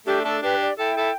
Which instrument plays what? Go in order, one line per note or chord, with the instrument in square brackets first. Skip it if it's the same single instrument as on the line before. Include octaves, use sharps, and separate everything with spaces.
[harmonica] A3 D4 [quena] G4
[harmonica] A3 D4 [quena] A4
[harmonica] D4 G4 [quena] B4
[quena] D5
[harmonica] E4 A4 [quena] G5
[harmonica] E4 A4